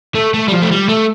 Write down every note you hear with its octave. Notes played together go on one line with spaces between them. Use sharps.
A3
A3
G3
F3
A3
G3
A3